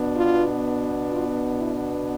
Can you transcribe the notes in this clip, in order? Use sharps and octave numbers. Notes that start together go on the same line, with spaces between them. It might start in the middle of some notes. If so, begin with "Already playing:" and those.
Already playing: B2 B3 D4
F4
F4
E4